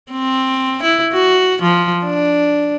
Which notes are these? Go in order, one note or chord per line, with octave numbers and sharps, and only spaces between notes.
C4
E4
F#4
F3
D4